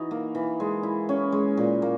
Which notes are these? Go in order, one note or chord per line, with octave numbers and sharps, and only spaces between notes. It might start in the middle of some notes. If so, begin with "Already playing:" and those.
Already playing: E3 D#4 F#4
A#3
E3
G#3
E4
C#4
G#3
A#2
A#3